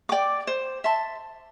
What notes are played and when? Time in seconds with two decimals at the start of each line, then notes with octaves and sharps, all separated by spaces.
0.09 D5 G5 D6
0.47 C5
0.84 E5 A5 C6